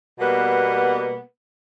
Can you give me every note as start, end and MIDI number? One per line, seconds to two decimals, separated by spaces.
0.20 1.21 47
0.20 1.21 55
0.20 1.21 58
0.20 1.21 59
0.20 1.21 78